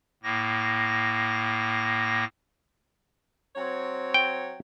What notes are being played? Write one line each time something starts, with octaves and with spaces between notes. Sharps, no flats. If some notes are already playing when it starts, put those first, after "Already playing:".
A2 A#3 A#6
F#3 C4 C#5
G5